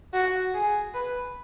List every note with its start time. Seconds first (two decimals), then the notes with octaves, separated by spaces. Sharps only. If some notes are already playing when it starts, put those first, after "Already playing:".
0.13 F#4
0.54 G#4
0.95 B4